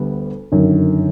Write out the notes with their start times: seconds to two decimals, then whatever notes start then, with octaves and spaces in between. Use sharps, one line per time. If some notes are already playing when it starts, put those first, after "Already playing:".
Already playing: D2 G3 B3
0.52 G1 F#2 D#3